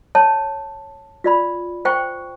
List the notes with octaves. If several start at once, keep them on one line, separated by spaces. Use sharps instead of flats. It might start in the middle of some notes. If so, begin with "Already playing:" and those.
C#5 A5
F4 D5 B5
C5 G5 C#6